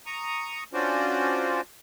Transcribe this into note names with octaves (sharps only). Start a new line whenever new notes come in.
A#5 C#6 D#6
C#4 D4 F4 F#4 C5 D5